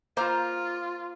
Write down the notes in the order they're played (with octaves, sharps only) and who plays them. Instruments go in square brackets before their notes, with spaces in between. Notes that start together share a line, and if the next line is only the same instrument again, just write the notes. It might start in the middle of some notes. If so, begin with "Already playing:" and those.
[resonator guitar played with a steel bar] A#3 C5 A#5 [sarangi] F4